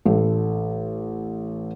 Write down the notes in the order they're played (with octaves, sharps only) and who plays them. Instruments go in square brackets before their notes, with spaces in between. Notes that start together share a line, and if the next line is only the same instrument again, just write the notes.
[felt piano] A1 A4